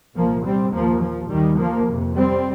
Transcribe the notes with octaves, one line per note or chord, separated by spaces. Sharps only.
C2 A#2 F3 A#3
G3 C4
D#2 F3 A#3
F3
D#2 D#3 G3
F3 A#3
F2 C3
G3 C4